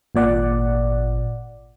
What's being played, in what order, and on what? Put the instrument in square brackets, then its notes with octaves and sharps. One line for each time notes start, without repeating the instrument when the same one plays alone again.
[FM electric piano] G#1 A#2 D5 F#5